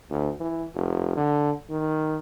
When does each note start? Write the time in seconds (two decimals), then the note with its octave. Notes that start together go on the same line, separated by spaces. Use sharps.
0.11 D2
0.40 E3
0.75 F1
1.17 D3
1.70 D#3